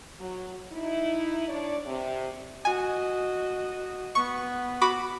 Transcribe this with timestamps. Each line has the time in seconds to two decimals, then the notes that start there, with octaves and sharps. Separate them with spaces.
0.19 F#3
0.72 D#4 E4
1.48 D4 C#5 D5
1.85 C3
2.65 F#4 D#5 G#5
4.15 B3 C#6
4.81 F#4 B5 D6